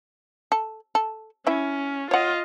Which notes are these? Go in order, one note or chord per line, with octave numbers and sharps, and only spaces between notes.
A4
A4
C#4 E4 E5
F4 C#5 D#5 F#5